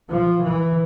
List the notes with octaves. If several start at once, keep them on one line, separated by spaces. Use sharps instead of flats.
F3
E3